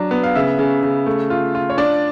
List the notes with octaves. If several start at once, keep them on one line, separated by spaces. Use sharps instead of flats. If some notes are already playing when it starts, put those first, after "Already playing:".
Already playing: F#3 D4
B3
F5
C#3 E5
C#3
C#3
A3
F4
F4
C#5
D4 D5